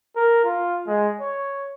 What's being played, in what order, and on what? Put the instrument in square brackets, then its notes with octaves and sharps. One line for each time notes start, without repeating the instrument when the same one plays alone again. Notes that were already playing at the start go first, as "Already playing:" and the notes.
[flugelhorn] A#4
F4
G#3
C#5